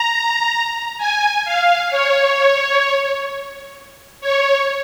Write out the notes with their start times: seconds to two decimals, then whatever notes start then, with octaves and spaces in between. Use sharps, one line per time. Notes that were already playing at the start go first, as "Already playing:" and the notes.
Already playing: A#5
0.98 G#5
1.45 F5
1.90 C#5
4.21 C#5